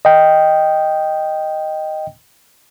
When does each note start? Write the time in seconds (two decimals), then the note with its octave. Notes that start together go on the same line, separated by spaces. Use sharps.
0.05 D#5 G5